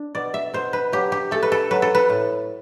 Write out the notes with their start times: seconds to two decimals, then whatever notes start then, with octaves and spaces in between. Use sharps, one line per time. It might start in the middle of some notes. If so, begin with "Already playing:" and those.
Already playing: D4
0.15 B2 D5
0.34 E5
0.54 B2 C5
0.73 B4
0.92 F#3 G4
1.12 G4
1.31 A3 A4
1.43 B4
1.52 A4
1.71 F#3 B4
1.82 A4
1.95 B4
2.10 A2